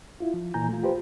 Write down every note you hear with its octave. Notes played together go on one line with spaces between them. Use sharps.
E4 F4
F3
A#2 E3 G#5 A#5 G6
A3 F4
F4 G4 B4 C5